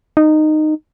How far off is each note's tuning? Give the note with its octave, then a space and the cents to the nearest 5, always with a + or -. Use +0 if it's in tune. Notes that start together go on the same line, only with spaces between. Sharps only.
D#4 -15